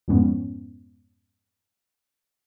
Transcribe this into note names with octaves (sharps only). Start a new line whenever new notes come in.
F2 G#2 F3 G#3 B3 C#4